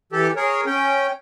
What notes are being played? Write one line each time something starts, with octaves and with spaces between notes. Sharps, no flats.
E3 G4 A4
G#4 A#4 C#5
C#4 G5